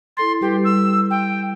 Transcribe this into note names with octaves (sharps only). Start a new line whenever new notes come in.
E4 A4 C6 A6
G3 G4 B4
E6
G5